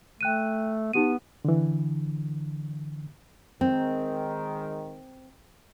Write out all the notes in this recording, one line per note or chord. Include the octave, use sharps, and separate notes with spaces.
A3 G5 F#6 D#7
B3 D#4 G4 D#7
D3 E3
D#3 G#3 C4